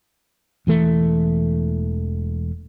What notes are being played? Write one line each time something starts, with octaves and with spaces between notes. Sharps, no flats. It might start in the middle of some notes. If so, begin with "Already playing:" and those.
E1 E3 A3